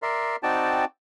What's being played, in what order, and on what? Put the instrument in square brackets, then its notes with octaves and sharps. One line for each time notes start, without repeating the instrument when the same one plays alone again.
[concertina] A#4 D5 E5 C6
C4 D#4 F#4 D5 G5 A5